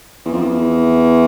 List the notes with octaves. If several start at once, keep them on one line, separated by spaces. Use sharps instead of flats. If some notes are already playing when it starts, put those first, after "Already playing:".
E2
F2
E2